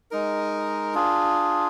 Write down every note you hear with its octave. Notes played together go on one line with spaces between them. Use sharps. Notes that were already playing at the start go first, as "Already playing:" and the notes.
G#3 D#4 A#4
D4 F4 G#4